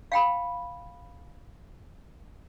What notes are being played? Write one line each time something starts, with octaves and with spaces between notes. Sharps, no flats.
F5 G5 B5